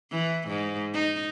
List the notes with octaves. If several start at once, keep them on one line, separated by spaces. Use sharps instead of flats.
E3
G#2
D#4